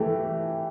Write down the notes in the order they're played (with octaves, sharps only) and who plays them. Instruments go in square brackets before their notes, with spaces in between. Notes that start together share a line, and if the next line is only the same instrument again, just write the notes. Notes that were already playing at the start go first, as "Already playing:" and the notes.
Already playing: [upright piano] E3 A3 G4